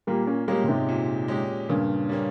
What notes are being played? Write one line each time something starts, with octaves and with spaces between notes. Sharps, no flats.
A#2 G3 A#3
A#3 C#4
G3 G#3 A#3 C#4 G4
A#2
G#2 C3
A#2
G#3 C#4 G4
G2 A#2 C#3
G3 A#3 C#4